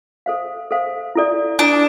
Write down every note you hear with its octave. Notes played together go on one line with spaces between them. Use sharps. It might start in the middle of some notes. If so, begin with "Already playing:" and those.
A4 C5 F5
A4 C5 F5
E4 A4 D5
D4 E4 A4 D5